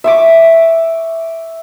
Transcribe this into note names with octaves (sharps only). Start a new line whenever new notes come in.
E5 C#6 D6